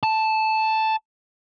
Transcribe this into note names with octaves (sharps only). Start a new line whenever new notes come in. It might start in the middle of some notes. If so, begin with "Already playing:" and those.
A5